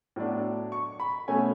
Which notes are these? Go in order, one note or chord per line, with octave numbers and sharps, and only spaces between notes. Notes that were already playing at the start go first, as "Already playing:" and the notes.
A2 F#3 B3 D4
C#6
B5
B2 A3 C#4 G#5